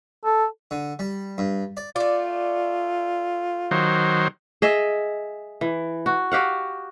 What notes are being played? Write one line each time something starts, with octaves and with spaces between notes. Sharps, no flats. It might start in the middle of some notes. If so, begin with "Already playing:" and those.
A4
D3
G3
G2
D5
A3 F4 D5
D#3 F#3 C5
G#4 D#5 E5
E3
F#4
F#4 G4 F5 F#5